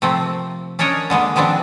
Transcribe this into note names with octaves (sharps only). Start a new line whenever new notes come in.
C3 F3 A3 A#3 C4
C#4 D4 A#4 C#5 D#5
D3 G#3 A#3 B3
D#3 F3 B3 C4 D4